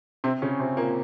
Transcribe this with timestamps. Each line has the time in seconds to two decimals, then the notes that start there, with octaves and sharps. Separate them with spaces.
0.24 C3 C4
0.42 C#3 C#4
0.59 C3 C4
0.77 A#2 A#3